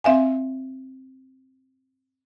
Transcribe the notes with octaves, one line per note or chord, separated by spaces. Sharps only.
C4 E5 F5 G#5